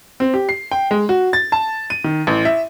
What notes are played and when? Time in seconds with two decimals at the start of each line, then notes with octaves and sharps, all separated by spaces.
0.20 C4
0.34 G4
0.49 C7
0.71 G5
0.91 G#3
1.09 F#4
1.33 A6
1.52 A5
1.90 D#7
2.04 D#3
2.27 A1
2.45 E5